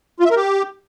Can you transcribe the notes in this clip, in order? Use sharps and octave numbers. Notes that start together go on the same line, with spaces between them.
F4
E5
A#4
G4